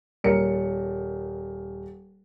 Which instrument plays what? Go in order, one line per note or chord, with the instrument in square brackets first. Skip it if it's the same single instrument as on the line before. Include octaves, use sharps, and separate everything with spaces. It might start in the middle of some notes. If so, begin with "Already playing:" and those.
[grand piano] D#1 A#4 C#7